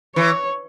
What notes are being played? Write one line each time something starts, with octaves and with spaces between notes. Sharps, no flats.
E3 C#5